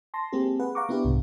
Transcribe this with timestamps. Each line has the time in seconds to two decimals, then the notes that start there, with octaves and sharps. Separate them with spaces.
0.14 A5 C6 A#6
0.32 G#3 A#3 C4 G4 G#4
0.59 G#4 B4 F#5
0.75 F5 F#5 A#5 C#6 D6
0.89 B3 D4 E4 G4 B4
1.05 C2 G#2